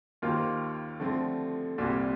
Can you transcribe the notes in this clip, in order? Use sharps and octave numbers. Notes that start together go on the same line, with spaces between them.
D#2 D#3 A#3 F4 C5
D3 F3 A3 C4
C2 A#2 G3 C4